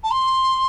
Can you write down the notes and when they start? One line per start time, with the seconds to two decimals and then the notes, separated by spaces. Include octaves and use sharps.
0.03 A5
0.10 C6